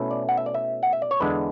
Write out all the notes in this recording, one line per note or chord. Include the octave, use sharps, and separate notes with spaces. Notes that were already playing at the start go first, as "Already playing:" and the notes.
Already playing: B2 A3 C#4 E4
D5
F#5
E5
D5
E5
F#5
E5
D5
C#5
E2 D3 G#3 D4 B4